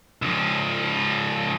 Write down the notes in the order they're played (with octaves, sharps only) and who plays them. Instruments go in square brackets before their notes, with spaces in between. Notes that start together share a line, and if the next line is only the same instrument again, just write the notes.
[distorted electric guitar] C#2 F3